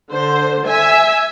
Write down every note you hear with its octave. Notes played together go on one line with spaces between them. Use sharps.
D3 C5
E5 G#5